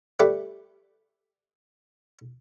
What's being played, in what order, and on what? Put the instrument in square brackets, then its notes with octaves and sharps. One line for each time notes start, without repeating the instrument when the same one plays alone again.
[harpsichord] G3 A3 G4 A4 B4 E5